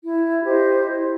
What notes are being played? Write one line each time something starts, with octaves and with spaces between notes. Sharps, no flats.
E4
G4 C5 D#5
E4